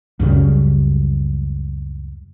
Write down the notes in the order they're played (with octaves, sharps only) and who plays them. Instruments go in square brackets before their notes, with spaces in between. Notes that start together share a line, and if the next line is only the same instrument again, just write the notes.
[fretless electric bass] C#2 F#2 C#3 G3